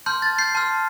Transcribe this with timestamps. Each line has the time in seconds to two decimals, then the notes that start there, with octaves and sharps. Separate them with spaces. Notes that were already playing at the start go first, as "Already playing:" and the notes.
0.06 A5 C6 F6 G6
0.22 A6
0.38 G6 C7
0.55 A5 C6 F6